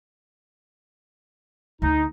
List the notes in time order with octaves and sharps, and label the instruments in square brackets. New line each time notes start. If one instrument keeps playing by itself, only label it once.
[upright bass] D2 [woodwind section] D#4